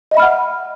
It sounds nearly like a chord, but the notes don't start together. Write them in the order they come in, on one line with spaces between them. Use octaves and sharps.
D#5 E5 B5 F6 F#5